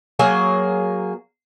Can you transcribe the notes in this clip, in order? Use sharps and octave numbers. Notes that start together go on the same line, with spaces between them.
F#3 A#3 G#4